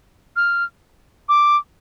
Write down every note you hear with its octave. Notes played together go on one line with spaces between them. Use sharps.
F6
D6